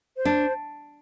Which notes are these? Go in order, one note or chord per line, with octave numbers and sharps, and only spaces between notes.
C5
D4